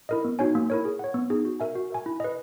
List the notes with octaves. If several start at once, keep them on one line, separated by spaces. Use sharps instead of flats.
E4 A#4 D#5
B3
D#4 F#4 C#5 G#5
A#3
E4 A#4 C#5
G#4
C#5 F#5
B3
D#4 G#4
F#4
A#4 E5 G#5
F#4
A#4 E5 G#5
E4
B4 D#5